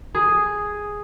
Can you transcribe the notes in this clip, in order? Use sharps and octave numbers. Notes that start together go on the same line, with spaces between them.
G#4